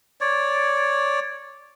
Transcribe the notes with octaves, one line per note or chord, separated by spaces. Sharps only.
C#5 D5